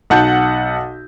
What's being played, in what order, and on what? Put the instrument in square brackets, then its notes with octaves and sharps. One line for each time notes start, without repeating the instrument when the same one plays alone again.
[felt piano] B1 F#5 A5 G6